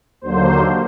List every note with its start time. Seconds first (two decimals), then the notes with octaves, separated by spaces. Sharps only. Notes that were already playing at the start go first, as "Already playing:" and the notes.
0.21 D#2 D3 F#3 A#3 C5